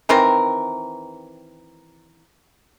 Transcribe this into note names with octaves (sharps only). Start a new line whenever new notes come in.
D#3 E3 C4 A#4